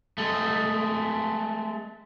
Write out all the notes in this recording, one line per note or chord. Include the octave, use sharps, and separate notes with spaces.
G#3 A3